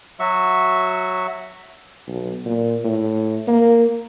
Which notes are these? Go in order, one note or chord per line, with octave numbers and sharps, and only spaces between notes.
F#3 F#4 E5 C#6
B1
A#2
A2
A#3